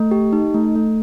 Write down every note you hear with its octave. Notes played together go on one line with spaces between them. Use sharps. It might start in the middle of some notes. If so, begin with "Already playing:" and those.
Already playing: A3
G4
D#4
A3
A3